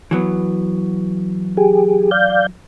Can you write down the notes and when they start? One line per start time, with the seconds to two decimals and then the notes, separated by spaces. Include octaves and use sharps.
0.11 E3 F#3 B3
1.57 G4 G#4
2.11 D5 F5 G6